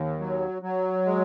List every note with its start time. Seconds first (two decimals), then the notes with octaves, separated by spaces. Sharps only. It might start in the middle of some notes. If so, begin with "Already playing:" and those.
Already playing: D#2
0.20 F#3
0.62 F#3
1.06 G#3